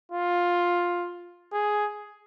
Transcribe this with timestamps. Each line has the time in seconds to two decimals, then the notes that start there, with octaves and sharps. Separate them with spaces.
0.11 F4
1.53 G#4